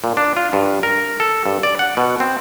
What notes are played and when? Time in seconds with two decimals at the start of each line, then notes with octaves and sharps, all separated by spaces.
0.04 A#2
0.17 D4
0.37 F4
0.53 G2
0.83 A#4
1.20 A4
1.46 G2
1.63 D5
1.79 F#5
1.97 B2
2.20 C4